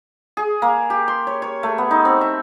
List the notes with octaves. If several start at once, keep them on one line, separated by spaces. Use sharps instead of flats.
G#4
A#3
G4
C6
C#5
C#5
A3
B3
D#4
C4
E5